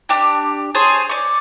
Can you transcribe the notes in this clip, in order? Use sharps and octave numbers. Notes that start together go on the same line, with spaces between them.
D4 G4
G#4 C5 C#5 A5
D5 C#6